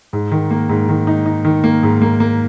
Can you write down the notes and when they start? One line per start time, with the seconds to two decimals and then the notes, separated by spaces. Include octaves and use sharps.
0.13 G#2
0.32 D#3
0.51 A#3
0.69 G#2
0.89 D#3
1.07 D#4
1.26 D#4
1.45 D#3
1.64 A#3
1.83 G#2
2.02 A#3
2.20 A#3